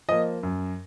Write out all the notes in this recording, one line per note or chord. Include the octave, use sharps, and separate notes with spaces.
F3 A#3 D#5
F#2